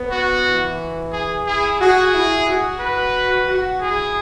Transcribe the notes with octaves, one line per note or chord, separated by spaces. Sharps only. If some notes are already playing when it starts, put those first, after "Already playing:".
Already playing: B3
F#4
E3
G#4
E4 G#4
F#4 G#4
E4
F#4
B4
F#4
E4 G#4